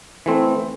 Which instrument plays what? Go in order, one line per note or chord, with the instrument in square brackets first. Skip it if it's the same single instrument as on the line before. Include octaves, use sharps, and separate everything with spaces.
[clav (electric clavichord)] E3 A3 C4